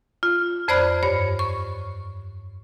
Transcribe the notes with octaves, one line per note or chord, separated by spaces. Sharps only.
F4
F2 C5 D5 B5 F6 F#6
G2 C#5
C#6